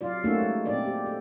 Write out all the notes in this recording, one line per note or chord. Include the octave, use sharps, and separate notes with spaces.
C3 F#3 F4 D5
A3 A#3 C#4 D#4 F#4 A4
G#3
A#2 F3 C4 D4 D5
G4
A4